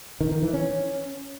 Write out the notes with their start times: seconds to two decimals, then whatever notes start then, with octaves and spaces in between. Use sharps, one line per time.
0.21 D#3
0.31 D#3
0.42 E3
0.53 C#4